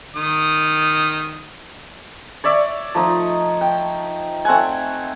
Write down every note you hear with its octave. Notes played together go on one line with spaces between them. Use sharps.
D#3 D#6
C#5 D5 E5
F3 A3 D#4 D#5
G5
A3 C4 F#5 G#5